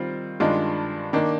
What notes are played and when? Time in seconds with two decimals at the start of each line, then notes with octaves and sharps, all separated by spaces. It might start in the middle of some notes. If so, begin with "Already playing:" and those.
Already playing: D#3 G3 C4 F4
0.40 G2 D#3 G#3 D4 F4
1.13 D#3 A#3 D4